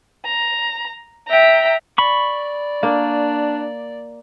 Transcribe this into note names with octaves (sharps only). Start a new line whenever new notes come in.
A#5
E5 G5 A#5
D5 B5 C#6
A#3 D4